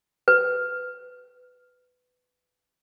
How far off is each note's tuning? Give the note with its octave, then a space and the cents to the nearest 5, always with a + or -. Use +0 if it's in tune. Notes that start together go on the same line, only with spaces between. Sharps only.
B4 +15